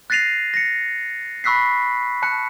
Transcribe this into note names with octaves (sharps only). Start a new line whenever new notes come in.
F#6 A6 A#6 C7 D#7 F7
A#6 C#7
B5 C#6 E6 F#6 B6 C7
A5 F#6 C#7